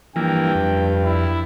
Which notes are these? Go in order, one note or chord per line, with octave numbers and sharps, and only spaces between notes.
G2 E3 F3 A#3 G5
F2
E4